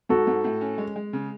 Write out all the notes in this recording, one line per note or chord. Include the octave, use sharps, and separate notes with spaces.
G#2 F#4 A4
G#2
A2
C#4
G#3
G#3
C#3